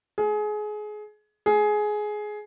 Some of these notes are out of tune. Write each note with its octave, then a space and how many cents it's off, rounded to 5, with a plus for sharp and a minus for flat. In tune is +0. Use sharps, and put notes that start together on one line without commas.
G#4 +25
G#4 +15